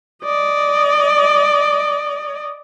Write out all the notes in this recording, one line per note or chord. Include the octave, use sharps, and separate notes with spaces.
D5 D#5